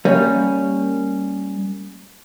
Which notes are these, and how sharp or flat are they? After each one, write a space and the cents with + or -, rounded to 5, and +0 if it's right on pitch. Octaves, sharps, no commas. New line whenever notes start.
G3 +0 A#3 -20 C#4 +0